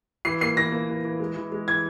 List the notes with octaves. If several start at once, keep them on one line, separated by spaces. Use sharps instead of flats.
E3 C7
A#3 C7
E3 A#6
A#3
E3
E3
G#3
E3
G#3
E3 G#6